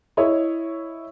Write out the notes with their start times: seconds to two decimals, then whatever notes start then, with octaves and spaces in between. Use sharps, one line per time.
0.17 E4 C#5 D#5